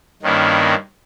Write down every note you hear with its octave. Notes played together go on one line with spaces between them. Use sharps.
G2 D#3 A#3 C#4 E4